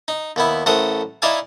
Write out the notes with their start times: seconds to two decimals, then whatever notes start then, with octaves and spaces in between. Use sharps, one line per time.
0.08 D#4
0.36 D#2 B3 E4
0.66 A1 A3 A#4 C5 F#5 D#6
1.22 D#4 E4 D5 E5 F5 G#5